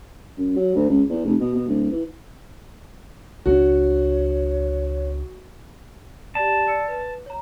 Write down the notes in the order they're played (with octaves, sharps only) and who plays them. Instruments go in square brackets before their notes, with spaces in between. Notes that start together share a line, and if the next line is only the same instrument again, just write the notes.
[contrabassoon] F#2
F#3
D2
C#2
E2
F1
B2
B2
D1
E3
[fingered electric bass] C#2 G#3 D4 [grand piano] F#4 [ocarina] C#5
[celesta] G4 D5 [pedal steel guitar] A5
[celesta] D5 E6 C#7
B4
C#5 A#5